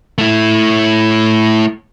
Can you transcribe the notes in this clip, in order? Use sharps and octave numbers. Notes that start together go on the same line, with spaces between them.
A3 E4